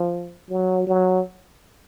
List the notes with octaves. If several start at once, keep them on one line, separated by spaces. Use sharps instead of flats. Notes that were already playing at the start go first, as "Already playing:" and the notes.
Already playing: F3
F#3
F#3